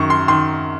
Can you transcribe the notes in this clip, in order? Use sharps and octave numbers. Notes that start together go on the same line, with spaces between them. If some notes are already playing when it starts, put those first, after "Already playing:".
Already playing: F#2 D#3 C#6
C6
D#3 C6